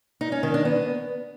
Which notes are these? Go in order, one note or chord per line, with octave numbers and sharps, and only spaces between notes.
D#4
C#4
D#3
D4
B3